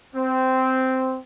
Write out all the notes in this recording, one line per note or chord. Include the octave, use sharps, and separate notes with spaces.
C4